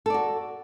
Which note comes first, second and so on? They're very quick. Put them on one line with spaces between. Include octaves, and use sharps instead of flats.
A4 D5 F#4